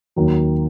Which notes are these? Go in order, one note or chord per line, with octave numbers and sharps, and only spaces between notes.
D#2 D#3 F#3